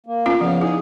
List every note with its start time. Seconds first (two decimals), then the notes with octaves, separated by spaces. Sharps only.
0.06 A#3
0.26 B3 C#4 F4
0.41 C#3 F3 B3 F5
0.61 D#4 E4 G#4